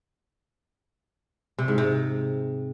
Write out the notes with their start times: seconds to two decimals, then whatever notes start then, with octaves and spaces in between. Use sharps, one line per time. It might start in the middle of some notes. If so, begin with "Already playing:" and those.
1.58 C3
1.68 G#2
1.78 C3